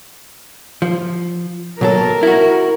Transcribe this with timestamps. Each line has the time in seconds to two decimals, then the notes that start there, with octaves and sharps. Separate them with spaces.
0.82 F3
1.81 B1 F#3 A4 A#4
2.23 E4 F#4